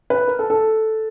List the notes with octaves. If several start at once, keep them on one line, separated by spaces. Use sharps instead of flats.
B4
A#4
A4
A4